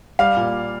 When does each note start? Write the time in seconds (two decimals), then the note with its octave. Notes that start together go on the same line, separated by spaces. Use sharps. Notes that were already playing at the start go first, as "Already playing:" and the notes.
0.19 G3 F5
0.37 A#2